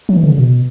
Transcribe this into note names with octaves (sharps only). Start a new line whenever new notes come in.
F#3
E3
D3
C#3
B2